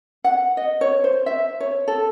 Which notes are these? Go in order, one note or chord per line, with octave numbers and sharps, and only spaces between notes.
F#5
D#5
C#5
C5
E5
C#5
A4